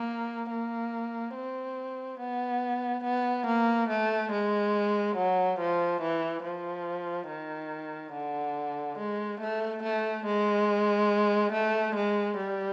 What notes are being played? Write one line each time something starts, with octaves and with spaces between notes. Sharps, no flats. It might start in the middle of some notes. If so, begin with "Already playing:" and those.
Already playing: A#3
A#3
C4
B3
B3
A#3
A3
G#3
F#3
F3
E3
F3
D#3
D3
G#3
A3
A3
G#3
A3
G#3
G3